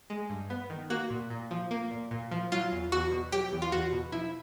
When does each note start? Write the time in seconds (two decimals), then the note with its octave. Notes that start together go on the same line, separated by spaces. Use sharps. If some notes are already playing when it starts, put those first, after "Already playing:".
0.10 G#3
0.30 G2
0.50 B3
0.70 D#3
0.90 A#3 F#4
1.10 A#2
1.30 A#2
1.51 F3
1.71 A#3
1.91 A#2
2.11 A#2
2.31 F3
2.52 F#3 F4
2.72 E2
2.92 E2 F#4
3.12 B2
3.32 F#3 G4
3.52 E2
3.62 F4
3.72 E2 F#4
3.92 B2
4.12 F3 E4